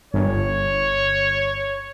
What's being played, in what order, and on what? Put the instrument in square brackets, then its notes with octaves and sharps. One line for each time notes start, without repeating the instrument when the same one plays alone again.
[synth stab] G1 [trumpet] C#5